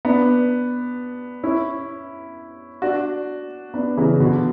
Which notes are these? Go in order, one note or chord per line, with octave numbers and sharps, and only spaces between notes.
B3 D4
C#4 E4
D4 F#4
B3 D4
C#3 E3
B2 D3